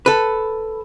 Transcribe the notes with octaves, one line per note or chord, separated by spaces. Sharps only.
A4 B4